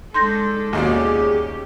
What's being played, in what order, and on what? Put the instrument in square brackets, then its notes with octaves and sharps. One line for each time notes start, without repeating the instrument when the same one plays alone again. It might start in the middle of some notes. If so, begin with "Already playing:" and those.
[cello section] G#3 D4 A4 [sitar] D#4 [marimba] C6 G6 A#6
[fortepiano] D#2 B2 [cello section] C#4 G4 [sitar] F4 G#4 D5